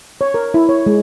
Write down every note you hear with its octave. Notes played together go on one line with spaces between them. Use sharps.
C#5
A#4
E4
C#5
G#3